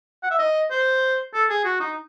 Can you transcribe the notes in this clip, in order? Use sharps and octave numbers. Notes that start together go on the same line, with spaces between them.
F#5
E5
D#5
C5
A4
G#4
F#4
D#4